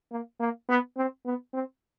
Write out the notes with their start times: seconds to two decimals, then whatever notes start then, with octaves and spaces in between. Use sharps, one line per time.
0.11 A#3
0.40 A#3
0.69 B3
0.97 C4
1.25 B3
1.54 C4